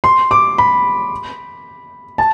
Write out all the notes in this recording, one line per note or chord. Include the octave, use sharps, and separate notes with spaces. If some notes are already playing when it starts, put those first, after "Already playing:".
C6
D6
B5
A5